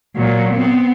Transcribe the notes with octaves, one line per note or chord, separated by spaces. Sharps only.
A#2 F#3
B3 C4